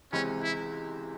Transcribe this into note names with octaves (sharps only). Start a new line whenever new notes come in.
C#2 C3 E3 G#3 C4 C#4
E4